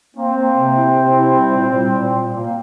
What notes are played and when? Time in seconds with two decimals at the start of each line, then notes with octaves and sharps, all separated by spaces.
0.16 A#3 C4
0.35 A#3
0.56 C3
0.76 E4
0.96 C3
1.16 E4
1.36 G3
1.56 A#2
1.75 G3
1.96 A#2
2.16 A#2
2.36 A#3